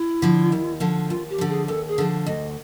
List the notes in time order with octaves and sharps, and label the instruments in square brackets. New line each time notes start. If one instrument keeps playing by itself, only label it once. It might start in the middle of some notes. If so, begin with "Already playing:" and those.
Already playing: [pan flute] E4
[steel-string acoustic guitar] D3 F3
D#2
D3 F3
[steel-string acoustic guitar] D#2 [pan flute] F4
[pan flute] G4
[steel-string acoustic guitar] D3 F3
[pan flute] G#4
[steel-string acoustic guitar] D#2 [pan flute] A4
[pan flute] G#4
[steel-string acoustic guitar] D3 F3
[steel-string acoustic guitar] D2 [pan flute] D#5